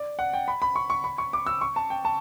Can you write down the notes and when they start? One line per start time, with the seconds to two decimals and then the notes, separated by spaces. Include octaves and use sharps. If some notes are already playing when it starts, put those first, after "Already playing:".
Already playing: D5
0.19 F#5
0.33 G5
0.48 B5
0.62 B5
0.76 C#6
0.90 C#6
1.04 B5
1.18 C#6
1.33 D6
1.46 E6
1.61 C#6
1.76 A5
1.90 G5
2.05 A5